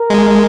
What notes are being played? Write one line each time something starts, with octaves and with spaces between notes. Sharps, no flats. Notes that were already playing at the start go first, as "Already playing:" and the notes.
Already playing: A#4
G#3